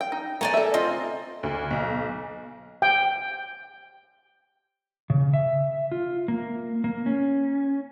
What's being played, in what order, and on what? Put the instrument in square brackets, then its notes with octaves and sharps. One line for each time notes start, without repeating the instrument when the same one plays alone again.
[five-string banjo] G5
D#4
[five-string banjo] A3 B3 [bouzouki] D5 G#5 A#5
[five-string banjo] A4 E5
[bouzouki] C4 [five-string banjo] F4 D#5
[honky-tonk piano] D2
B1
[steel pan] G5
[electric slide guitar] C#3
E5
F4
A#3
A#3
C#4